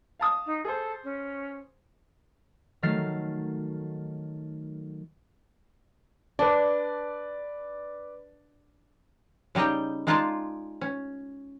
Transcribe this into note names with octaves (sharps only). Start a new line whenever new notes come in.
F5 A5 D#6
D#4
G#4 A4 C5
C#4
D#3 F#3 A3 F6 A6 C7
D4 B4 D5
C#3 G3 D#4 D#5 G5
G#3 D#4 F4 D5 F5 A5
C#4